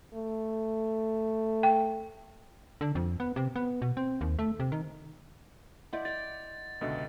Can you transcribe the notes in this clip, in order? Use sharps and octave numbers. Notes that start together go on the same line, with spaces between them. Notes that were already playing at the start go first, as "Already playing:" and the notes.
A3
G5
D3
F2
B3
C3
B3
B2
C4
D#2
A3
C3
D#3
E4 D5 D#5 F#5 C6 G6
D5 G5 A6
C#2 B2 D3 D#5 E5